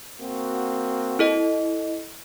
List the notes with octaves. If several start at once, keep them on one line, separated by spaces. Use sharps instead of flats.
A#3 C4 F#4
E4 A4 D#5